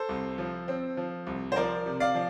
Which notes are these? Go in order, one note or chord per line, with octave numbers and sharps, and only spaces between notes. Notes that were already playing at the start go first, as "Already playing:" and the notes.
Already playing: A4 C5
C2
F3
C4
F3
C2
C5
F3 A#4 D5
C3
D5 F5
F3